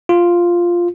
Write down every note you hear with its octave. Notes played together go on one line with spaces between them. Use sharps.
F4